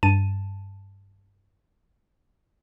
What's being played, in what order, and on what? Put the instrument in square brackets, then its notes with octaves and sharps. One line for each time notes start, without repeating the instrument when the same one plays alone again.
[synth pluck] G2 A5 D#7